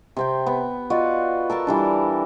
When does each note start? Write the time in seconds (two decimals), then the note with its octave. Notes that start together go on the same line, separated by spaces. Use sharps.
0.17 C3 C4 G5
0.46 B3
0.90 F4 F#4 D5 D#5
1.50 A4 A#4 A5 C#6
1.67 E3 G3 D4